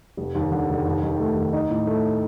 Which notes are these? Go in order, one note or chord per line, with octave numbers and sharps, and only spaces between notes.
F1
D#2
D3
F1
D#2
D#3
A3
D#2
D#4
A2
A3